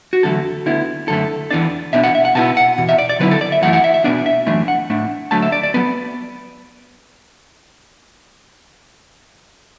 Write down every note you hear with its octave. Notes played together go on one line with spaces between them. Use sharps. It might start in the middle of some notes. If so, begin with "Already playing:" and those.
F#4
E2 D3 F#3 A3 A4
D2 D3 B3 E4
F#2 D3 A3 A4
E2 E3 B3 D4 D5
B2 B3 D4 E5
F#5
E5
F#5
B2 B3 E4 A5
F#5
E2 B2
E5
D5
D5
D3 F#3 B3 E4 B4
A4
D5
E5
F#2 E3 A3 E4 F#5
F#5
E5
E5
B2 B3 D4 D5
E5
F#2 E3 A3 D4 E5
F#5
A2 A3 D4
D2 D3 F#3 A3 A5
E5
D5
D5
F#3 B3 B4